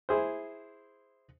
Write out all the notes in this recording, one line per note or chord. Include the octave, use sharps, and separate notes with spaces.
E4 G#4 C5